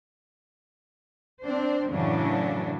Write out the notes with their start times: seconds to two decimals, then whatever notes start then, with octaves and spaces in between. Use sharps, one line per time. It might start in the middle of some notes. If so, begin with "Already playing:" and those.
1.42 C4 D4 C5
1.90 F#2 A2 C#3 E3 F#3 D4